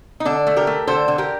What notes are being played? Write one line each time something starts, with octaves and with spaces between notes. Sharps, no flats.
D#4
D3 D4
A3
G4 A#4
A3
D3 A4 C5
D3
G4 A#4